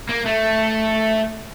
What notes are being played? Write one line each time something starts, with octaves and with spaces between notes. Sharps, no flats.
A#3
A3